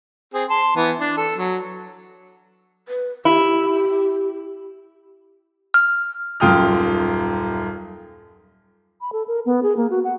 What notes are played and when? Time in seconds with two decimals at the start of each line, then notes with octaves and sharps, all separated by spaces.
0.34 C4 G#4
0.50 A5 C6
0.76 E3 B3
1.00 D4
1.17 A4
1.38 F#3
2.88 B4
3.25 E4 G4
5.74 F6
6.40 D#1 F#2 F4 G5 D#6 F6
9.01 B5
9.13 A4
9.28 A#4
9.46 B3
9.63 G#4
9.77 A#3
9.90 F#4
10.04 F#5